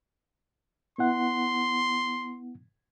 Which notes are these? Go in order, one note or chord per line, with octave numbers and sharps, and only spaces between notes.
B3 E4 F#5 C6